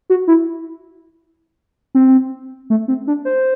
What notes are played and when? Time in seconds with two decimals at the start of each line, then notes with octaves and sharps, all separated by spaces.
0.10 F#4
0.27 E4
1.95 C4
2.70 A3
2.88 C4
3.07 D4
3.25 C5